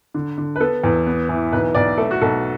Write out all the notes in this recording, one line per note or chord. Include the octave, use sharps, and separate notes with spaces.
D3
D3
B4
B3 A4
E2
B3
E3
B1 B4
B1 D5
A3 A4
F#4
B1 A4